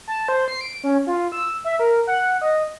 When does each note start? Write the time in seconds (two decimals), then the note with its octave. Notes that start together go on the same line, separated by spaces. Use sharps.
0.08 A5
0.29 C5
0.48 C7
0.61 D7
0.84 C#4
1.07 F4
1.32 E6
1.65 E5
1.79 A#4
2.07 F#5
2.41 D#5